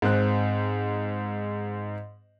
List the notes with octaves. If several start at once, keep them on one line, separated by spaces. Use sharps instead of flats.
G#2 C4 F#6